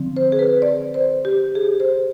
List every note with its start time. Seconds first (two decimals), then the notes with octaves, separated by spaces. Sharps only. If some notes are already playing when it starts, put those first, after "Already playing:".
Already playing: D3 F3 C4
0.17 C5
0.32 G#4
0.39 B4
0.62 D5
0.94 C5
1.25 G4
1.55 G#4
1.80 C5